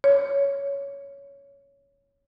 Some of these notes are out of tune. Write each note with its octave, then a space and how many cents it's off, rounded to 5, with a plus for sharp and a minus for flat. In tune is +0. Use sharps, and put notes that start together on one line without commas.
C#5 +10